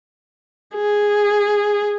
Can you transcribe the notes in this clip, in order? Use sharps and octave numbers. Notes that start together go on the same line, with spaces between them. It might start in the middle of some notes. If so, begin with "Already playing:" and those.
G#4